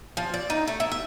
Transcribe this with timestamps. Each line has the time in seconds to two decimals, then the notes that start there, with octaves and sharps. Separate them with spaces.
0.17 F3
0.34 D5
0.50 D#4
0.67 A3
0.80 E4
0.92 E5